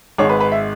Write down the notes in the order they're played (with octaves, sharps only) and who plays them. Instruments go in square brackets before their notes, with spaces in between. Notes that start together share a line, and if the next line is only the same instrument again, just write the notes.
[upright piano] G#1 G#2 G#3 C#5
B4
B4
E5